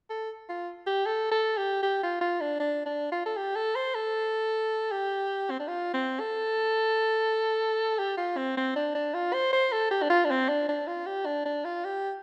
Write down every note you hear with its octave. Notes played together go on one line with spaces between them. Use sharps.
A4
F4
G4
A4
A4
G4
G4
F4
F4
D4
D4
D4
F4
A4
G4
A4
C5
A4
G4
C4
D4
F4
C4
A4
G4
F4
C4
C4
D4
D4
F4
C5
C5
A4
G4
D4
F4
D4
C4
D4
D4
F4
G4
D4
D4
F4
G4